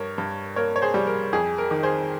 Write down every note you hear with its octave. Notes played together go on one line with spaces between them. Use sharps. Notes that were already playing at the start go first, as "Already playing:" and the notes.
Already playing: G2 A#4 C#5
G2
A#3 A#4 C#5
C#5
G#4 C5
G3
A#4
F2 G#4
A#4
D#3
G#4 C5